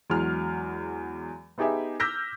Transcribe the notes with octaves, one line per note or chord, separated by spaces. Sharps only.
E2 F#3 G#3 F6
B3 D#4 G4 G#4 E5
D6 E6 F6 G6 A#6 B6